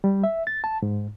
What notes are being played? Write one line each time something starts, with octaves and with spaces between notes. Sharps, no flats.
G3
E5
A6
A5
G#2